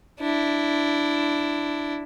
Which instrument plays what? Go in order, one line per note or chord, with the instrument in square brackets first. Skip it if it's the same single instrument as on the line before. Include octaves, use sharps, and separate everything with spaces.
[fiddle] D4 E4